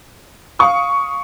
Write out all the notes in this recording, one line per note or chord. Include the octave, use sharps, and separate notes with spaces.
F5 C#6 D#6